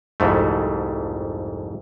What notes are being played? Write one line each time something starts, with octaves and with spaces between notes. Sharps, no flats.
C2 F2 G#2 A3